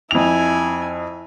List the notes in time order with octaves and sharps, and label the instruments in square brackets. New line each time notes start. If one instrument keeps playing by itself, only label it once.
[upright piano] F2 F7 [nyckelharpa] E4 G#5